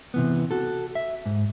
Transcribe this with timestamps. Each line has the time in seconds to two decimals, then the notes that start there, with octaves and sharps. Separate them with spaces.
0.14 C3 E3 B3
0.51 F#4 A4
0.95 E5
1.26 G#2